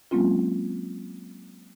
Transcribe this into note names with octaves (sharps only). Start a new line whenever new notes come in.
F#3 G#3 A#3 C4 C#4 F4